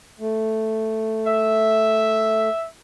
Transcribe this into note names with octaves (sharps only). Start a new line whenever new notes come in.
A3
E5